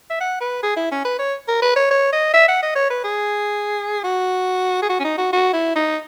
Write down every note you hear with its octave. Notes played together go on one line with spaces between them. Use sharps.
E5
F#5
B4
G#4
E4
C#4
B4
C#5
A#4
B4
C#5
C#5
D#5
E5
F#5
D#5
C#5
B4
G#4
F#4
G#4
F#4
C#4
D#4
F#4
F#4
E4
D#4